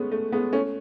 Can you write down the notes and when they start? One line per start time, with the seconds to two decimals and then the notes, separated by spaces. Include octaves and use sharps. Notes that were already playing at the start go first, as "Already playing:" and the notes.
Already playing: G#3 A3 B3 C#4
0.12 A3
0.32 G#3 B3
0.53 A3 C#4